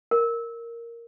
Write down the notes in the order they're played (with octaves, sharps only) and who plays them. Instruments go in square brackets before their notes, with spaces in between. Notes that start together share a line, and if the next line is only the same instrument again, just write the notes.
[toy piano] A#4